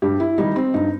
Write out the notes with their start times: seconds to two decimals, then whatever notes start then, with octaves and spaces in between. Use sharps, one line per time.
0.02 G2 G4
0.20 E4
0.38 D#3 G3 D#4
0.56 C4
0.74 G2 D#4